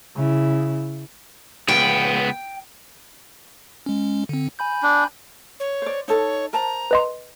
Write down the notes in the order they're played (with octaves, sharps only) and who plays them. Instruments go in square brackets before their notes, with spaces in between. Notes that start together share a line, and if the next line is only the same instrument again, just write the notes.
[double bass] C#3 E4
[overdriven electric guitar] C#2 B3 [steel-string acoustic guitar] G5
[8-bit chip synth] G#3 C#4
D3 C4
G#5 B5 G6
[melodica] D4
[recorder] C#5
[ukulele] C5 D5
[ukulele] D#4 A4 [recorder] C#5
[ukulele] A#4 C5 A5 [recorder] A#5
[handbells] B4 D#5 C6